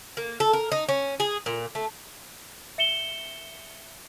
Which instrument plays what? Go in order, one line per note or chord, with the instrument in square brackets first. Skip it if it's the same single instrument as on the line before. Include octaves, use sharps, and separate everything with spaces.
[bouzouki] A#3
A4
A#4
D#4
C#4
G#4
A#2
A3
[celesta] E5 C#7 E7 G7